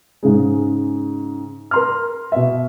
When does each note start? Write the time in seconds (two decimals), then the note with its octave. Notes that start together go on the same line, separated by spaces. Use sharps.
0.23 G#2 C#3 G#3
1.71 A#4 C6 F6
2.32 B2 E5